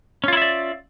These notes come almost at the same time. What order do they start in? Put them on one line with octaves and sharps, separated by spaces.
C#4 F4 E4 E5 D5